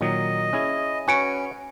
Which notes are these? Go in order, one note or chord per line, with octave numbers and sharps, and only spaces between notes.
A#2 D#3 F#3 D#5
C#4 E4 G#4
C#4 F#4 B4 C#5 G#5 C#7 D7